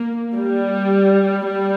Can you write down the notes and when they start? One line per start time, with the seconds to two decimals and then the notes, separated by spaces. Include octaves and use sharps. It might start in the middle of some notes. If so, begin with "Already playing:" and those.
Already playing: A#3
0.35 G3
1.45 G3